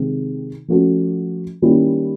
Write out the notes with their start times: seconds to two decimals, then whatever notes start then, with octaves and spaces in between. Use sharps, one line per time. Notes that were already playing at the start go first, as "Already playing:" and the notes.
Already playing: C3 D#3 G#3 C4
0.68 F3 A3 C#4 F#4 A4
1.62 D#3 G3 A#3 C#4 E4